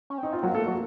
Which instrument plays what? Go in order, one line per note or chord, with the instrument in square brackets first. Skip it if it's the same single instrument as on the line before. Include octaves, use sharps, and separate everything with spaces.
[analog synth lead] C#4
[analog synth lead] C4 [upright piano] D#4
[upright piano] F4
[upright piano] F#3 F#4 [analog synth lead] A#3
[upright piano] A3 A4
F#3 F#4